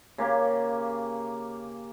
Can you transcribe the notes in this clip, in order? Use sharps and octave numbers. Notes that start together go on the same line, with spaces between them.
C#3 A#3 G4